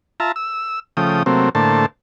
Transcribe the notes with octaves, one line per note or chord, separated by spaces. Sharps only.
F4 E5 A5 A#5
E6
C#3 F3 A3 G5 D#6
C3 F#3 A3 A#3 C4
A2 D3 A3 A#3 C5 A5